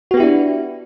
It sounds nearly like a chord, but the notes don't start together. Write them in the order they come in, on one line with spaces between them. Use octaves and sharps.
F#4 B3 G4 E4 D4